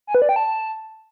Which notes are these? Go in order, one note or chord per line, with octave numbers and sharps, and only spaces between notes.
G#5
B4
D5
G5
A5